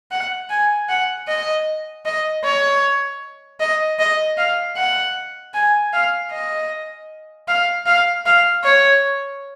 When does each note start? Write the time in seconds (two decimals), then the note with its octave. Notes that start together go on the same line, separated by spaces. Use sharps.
0.11 F#5
0.50 G#5
0.89 F#5
1.27 D#5
2.05 D#5
2.44 C#5
3.60 D#5
3.99 D#5
4.38 F5
4.77 F#5
5.54 G#5
5.93 F5
6.31 D#5
7.48 F5
7.86 F5
8.26 F5
8.64 C#5